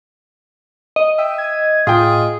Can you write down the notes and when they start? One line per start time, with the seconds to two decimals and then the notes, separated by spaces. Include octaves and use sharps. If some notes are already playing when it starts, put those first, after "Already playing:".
0.96 D#5
1.19 E5 G5
1.38 G#6
1.87 A2 F4 G#4 G5